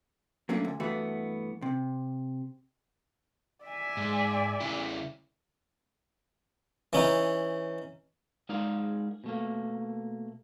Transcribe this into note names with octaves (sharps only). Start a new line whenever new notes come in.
F#3 A3 A#3 C#4 D4
D2
G2 E3 A3 B3 F#4
C3
D5 E5 G#5
G#2 G#3
C#3 C#4 E4
E3 C#4 D#4
G#3 D#4 G#4 A#4 D5 F5
B2 A3 A#3